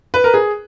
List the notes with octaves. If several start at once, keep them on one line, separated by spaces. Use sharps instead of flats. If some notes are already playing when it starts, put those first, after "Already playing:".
B4
A#4
G#4